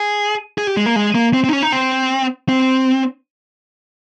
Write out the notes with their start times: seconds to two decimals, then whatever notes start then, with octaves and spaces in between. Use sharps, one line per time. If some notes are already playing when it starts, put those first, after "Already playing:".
Already playing: G#4
0.58 G#4
0.67 G4
0.77 G#3
0.86 A#3
0.96 G#3
1.15 A#3
1.34 C4
1.44 C4
1.49 D#4
1.53 C#4
1.63 D#4
1.72 C4
2.49 C4